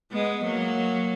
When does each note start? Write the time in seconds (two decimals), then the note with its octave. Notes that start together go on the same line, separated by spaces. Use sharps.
0.12 G#3 B3
0.44 F#3 A#3